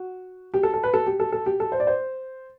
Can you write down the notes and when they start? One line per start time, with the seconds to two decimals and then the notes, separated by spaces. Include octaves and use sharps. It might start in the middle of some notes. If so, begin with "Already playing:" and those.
Already playing: F#4
0.54 G4
0.63 A4
0.74 A4
0.84 B4
0.94 A4
1.07 G4
1.20 A4
1.32 A4
1.46 G4
1.60 A4
1.72 C5
1.80 D5
1.87 C5